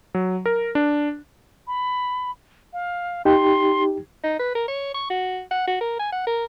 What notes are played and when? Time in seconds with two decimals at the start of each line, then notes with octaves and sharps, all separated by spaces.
0.14 F#3
0.46 A#4
0.75 D4
1.67 B5
2.73 F5
3.25 D#4 G4 G5 C6
4.23 D#4
4.39 B4
4.55 A#4
4.68 C#5
4.94 C#6
5.10 F#4
5.51 F#5
5.67 F#4
5.81 A#4
5.99 G#5
6.12 F#5
6.27 A#4